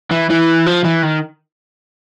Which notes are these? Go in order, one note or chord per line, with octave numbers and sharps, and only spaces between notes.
E3
E3
F3
E3
D#3